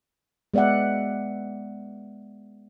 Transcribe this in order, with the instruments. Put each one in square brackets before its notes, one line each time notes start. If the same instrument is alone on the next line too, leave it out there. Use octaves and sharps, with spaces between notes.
[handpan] G#3 B3 D5 E5 F#5